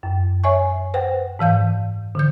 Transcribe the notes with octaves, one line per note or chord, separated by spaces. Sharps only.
F#2
C#5 E5 G#5 C#6
B4 C5 F#5 G5
G#2 E3 F5 G6
D3 E3 G6